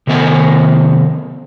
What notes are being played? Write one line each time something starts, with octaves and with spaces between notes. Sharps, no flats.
C3 D#3 B3 D#5 G#5